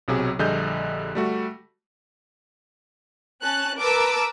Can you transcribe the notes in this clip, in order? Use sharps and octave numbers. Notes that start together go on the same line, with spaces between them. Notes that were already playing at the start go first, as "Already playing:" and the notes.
B1 C3 F#3 G#4
A#1 D3 G3 G#4 D#5 G6
G3 A3 F#4
C#4 A5 F#6
A#4 B4 A5 D6 E6